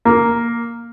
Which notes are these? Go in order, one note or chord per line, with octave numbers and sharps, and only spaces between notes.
A#3